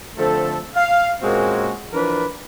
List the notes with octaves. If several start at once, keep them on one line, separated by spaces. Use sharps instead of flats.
D3 F3 A3 C4 A4
F5
A#2 G#3 A#3 C4 C#4 F#4
E3 F3 D4 A#4 B4